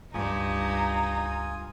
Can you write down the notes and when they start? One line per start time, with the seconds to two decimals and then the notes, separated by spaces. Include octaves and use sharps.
0.14 C#2 G2 D#4 F4 G#5 D#6